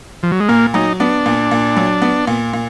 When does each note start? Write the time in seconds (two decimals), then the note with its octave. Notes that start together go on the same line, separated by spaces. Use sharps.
0.23 F3
0.32 F#3
0.40 G#3
0.49 A#2 A#3
0.74 F#3 D#4
1.00 B3 D4
1.26 A#2
1.51 A#2
1.77 F#3
2.02 B3
2.27 A#2
2.53 A#2